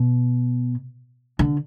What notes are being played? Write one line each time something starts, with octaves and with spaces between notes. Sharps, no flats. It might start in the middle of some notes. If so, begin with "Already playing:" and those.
Already playing: B2
D3